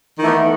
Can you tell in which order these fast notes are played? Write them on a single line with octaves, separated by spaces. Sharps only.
D#3 E3 A3 B3